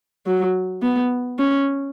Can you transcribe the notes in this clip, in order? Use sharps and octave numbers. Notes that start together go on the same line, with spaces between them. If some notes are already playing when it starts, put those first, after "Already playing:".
F#3
B3
C#4